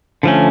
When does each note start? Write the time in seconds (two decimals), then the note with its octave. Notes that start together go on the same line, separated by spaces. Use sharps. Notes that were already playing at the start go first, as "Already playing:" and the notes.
0.23 D3 F3 A3 C#4